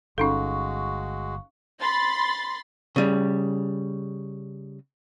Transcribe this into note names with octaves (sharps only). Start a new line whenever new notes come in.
G1 G#3 C#4 D#4 F#4 A4 F5 C#6
B5 C6 A6
C#3 G3